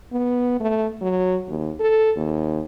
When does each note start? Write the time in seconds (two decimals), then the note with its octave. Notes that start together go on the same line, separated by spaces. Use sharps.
0.13 B3
0.60 A3
1.01 F#3
1.48 D#2
1.80 A4
2.17 D#2